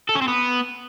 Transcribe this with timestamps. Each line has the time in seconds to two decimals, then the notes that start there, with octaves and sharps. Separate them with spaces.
0.09 A4
0.15 C#4
0.22 C4
0.28 B3